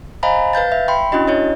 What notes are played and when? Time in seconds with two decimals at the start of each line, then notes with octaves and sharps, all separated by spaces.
0.23 C5 D#5 F5 G#5 A#5 B5
0.53 B4 F5 G6 A6
0.72 E5
0.88 G5 B5 C6
1.12 C#4 D4 E4 F#4 D#5
1.27 E4 C#5 D#5